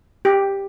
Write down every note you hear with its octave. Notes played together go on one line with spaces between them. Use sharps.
G4